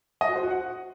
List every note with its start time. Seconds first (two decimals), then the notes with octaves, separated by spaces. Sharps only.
0.21 D#5
0.28 F#4
0.36 C5
0.43 F#4
0.50 F#5